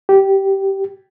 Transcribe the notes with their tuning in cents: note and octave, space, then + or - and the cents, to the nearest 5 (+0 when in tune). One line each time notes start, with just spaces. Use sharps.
G4 -15